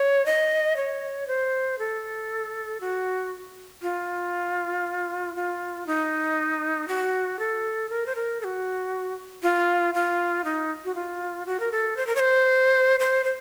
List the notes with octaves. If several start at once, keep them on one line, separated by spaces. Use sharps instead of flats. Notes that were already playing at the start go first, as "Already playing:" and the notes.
Already playing: C#5
D#5
C#5
C5
A4
F#4
F4
F4
D#4
F#4
A4
A#4
C5
A#4
A4
F#4
F4
F4
D#4
F#4
F4
F#4
A#4
A4
C5
A#4
C#5
C5
C5
C5